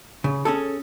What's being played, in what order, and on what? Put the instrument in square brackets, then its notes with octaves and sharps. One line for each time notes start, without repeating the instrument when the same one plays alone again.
[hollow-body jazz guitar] C#3
C#4 G#4 A4